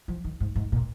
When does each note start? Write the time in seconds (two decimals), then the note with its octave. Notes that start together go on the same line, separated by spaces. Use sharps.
0.08 F3
0.24 D#3
0.40 G#2
0.56 G#2
0.72 A#2